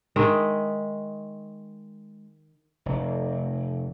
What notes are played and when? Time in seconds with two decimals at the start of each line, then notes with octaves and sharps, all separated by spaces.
0.16 D#3 G#3 D#5 E5
2.86 F1